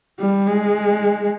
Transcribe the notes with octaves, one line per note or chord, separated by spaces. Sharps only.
G3
G#3